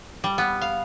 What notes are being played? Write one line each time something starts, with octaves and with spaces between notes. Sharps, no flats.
G3
B3
F5